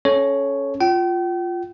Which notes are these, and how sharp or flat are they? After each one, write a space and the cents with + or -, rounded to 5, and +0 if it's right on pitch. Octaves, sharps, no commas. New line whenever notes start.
C#4 +0 A4 -25 C#5 +0
F4 +0 G5 -40